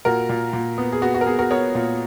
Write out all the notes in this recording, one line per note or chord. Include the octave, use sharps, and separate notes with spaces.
A#2 F#4 A#4
A#2
A#2
B3
G#4
B3 F#4
F#4
A#4
B3 G#4
F#4 A#4
B3 A#4 C#5
A#2